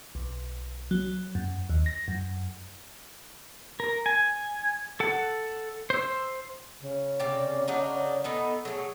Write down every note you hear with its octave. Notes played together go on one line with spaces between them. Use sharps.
B1
F#3
F#2
D#2
A#6
F#2
A#4
G#5
A4 F#5
C5 E6
C#3
C3 G4 D5
F#3 D4 D#4
A3 B3 D#4 A4
F#3 A3 G#4